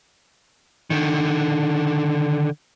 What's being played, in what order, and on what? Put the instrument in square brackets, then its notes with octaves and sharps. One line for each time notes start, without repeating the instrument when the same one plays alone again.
[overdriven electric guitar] D3 D#3